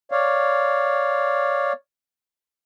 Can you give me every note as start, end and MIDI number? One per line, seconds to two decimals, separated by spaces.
0.11 1.72 73
0.11 1.72 74
0.11 1.72 77